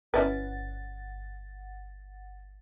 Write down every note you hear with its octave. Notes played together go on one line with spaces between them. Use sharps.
G1 C#4 E4 B4 F#5 A6